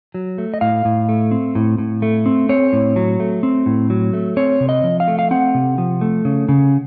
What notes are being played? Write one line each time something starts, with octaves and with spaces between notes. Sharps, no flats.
F#3
A3
D#5
A2 F5
A2
A3
C4
A2
A2
A3
C4
C4 C#5
A2
F#3
A3
C4
A2
F#3
A3
C4 C#5
C3
D#5
F3
F5
A3
F5
C4 F#5
C3
F3
A3
C#3
C#3